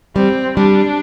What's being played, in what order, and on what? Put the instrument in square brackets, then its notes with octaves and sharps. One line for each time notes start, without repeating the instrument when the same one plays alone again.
[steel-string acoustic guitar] G3 [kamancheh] C4
[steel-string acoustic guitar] G3 [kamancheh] D4